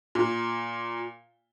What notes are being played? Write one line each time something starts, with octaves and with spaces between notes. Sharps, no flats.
A#2